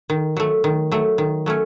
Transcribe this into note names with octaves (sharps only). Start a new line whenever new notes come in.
D#3
F#3 A3
D#3
F#3 A3
D#3
F#3 A3 C#4